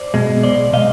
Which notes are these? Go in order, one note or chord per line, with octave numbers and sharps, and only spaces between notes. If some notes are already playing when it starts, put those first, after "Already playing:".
Already playing: C5 D5
B2 G#3
B1 C5 D5
B2 G#3 D#5 F5